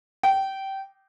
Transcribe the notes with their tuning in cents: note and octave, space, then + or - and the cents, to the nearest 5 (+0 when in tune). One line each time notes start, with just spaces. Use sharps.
G5 -20